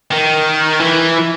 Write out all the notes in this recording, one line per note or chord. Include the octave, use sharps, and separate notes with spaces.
D#3
E3